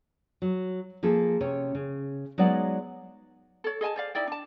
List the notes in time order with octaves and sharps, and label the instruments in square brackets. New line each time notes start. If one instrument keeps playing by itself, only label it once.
[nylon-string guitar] F#3
F3 A#3 G#4 A4
C3 C#4 C#5
C#3
F#3 G#3 B3 D#4 D5 F#5
[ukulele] A4 C#5
G#4 D#5 G#5 A5
C5 D5 F5
D#4 E4 D5 G5
D4 A5